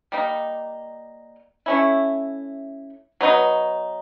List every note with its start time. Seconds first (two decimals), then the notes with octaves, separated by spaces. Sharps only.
0.12 G3 A#3 D#4
1.66 A3 C#4 E4
3.21 F#3 B3 D#4